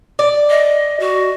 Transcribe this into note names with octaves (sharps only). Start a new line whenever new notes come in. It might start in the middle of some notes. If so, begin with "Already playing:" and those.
D5
D#5
F#4